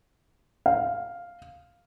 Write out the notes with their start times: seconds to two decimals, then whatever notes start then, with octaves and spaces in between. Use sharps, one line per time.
0.66 F5